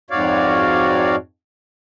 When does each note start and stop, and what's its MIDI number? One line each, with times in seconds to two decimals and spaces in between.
0.11 1.16 41
0.11 1.16 44
0.11 1.16 66
0.11 1.16 73
0.11 1.16 74
0.11 1.16 77